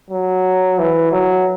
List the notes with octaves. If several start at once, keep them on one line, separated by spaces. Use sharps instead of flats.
F#3
E3
F#3